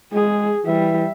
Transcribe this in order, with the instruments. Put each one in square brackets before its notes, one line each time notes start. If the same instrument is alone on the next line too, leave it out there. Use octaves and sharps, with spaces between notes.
[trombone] G#3 [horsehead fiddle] G#4
[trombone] E3 [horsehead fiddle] G3 E5